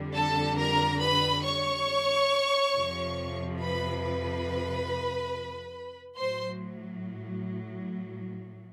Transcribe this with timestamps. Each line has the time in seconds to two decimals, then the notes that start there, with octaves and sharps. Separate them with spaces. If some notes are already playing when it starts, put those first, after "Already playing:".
Already playing: F2 D3 G3
0.14 A4 A5
0.58 A#4 A#5
1.01 B4 B5
1.44 C#5 C#6
2.73 F2 C3 F3
3.59 B4 B5
4.03 B4 B5
6.18 A2 F#3 C5 C6